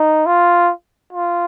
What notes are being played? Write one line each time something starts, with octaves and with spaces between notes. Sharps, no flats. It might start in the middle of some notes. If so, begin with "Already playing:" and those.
Already playing: D#4
F4
F4